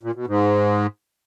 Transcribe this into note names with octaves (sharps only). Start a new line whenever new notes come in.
A#2
B2
G#2